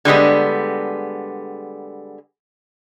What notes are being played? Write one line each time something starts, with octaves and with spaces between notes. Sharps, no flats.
D3 G3 G#3 B3